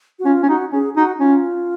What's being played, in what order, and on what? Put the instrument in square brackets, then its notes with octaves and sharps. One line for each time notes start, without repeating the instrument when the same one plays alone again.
[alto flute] F#4
[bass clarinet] C#4 [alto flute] F4
[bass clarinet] C#4
[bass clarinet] D#4 [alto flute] F#4
[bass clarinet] C#4 [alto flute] G#4
[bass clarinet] D#4 [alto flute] F#4
[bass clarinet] C#4 [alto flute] F4